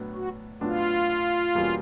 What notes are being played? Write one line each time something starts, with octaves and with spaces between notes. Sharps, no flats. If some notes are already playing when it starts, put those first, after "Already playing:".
Already playing: A2 F#3 B3 D4
F#4
A2 F#3 B3 D4 F4
E2 B2 G3 A#3 C#4